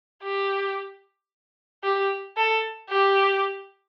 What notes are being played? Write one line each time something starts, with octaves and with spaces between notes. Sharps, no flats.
G4
G4
A4
G4